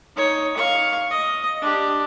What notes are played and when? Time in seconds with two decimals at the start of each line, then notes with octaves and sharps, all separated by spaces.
0.16 D#4 C#5
0.57 F5 C#6
1.10 D#5
1.61 D4 G4